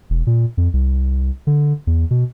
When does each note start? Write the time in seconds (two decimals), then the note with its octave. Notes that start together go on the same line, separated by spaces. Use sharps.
0.10 E1
0.27 A#2
0.57 F2
0.73 C2
1.47 D3
1.87 E2
2.11 B2